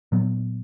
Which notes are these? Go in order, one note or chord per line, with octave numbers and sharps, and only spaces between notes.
A#2 F#3 B3